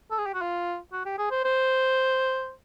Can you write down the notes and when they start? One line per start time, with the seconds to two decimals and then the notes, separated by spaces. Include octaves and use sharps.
0.11 A4
0.18 G#4
0.26 G4
0.34 F#4
0.41 F4
0.93 F#4
1.05 G4
1.18 G#4
1.31 C5
1.44 C5